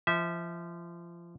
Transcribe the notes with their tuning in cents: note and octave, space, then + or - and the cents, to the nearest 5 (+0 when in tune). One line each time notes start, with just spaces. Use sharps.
F3 -25 E5 -20